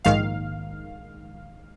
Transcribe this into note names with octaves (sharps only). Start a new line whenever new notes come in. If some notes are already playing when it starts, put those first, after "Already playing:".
A#1 G#2 D#3 F5